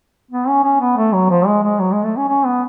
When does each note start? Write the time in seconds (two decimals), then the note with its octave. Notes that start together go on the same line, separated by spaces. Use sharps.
0.31 B3
0.48 C#4
0.64 C#4
0.80 B3
0.97 A3
1.13 F#3
1.29 F3
1.46 G#3
1.63 G#3
1.79 F#3
1.92 G#3
2.04 A3
2.16 C#4
2.29 C#4
2.45 B3